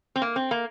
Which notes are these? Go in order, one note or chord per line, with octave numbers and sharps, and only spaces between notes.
C4
A#3
C4
A#3